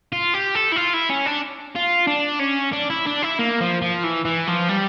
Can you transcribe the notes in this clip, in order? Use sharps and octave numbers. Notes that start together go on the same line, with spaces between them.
F4
G4
A4
E4
F4
E4
C#4
D4
F4
D4
C#4
D4
E4
D4
E4
A#3
F3
F3
E3
E3
F3
G3